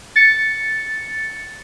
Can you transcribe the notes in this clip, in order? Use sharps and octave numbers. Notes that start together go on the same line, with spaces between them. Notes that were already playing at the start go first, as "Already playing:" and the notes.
A6 C#7